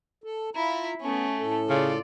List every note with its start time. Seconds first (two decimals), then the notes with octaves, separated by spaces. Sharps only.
0.24 A4
0.55 E4 F4 A#5 B5
1.01 A3 B3 C#4
1.39 A2 A4
1.70 C#3 F4 D5